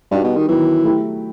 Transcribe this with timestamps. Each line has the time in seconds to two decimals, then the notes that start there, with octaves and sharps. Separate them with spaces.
0.11 G2 G3 D#4 F#4
0.24 B2
0.36 D#3
0.48 D#3 E3 F#3 B3
0.84 F#3 A3 E4 G4